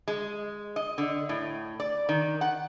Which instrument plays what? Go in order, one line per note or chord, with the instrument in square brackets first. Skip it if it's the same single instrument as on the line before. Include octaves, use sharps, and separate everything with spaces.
[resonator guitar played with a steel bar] G#3
D#5
D3
A2
D5
D#3
F#5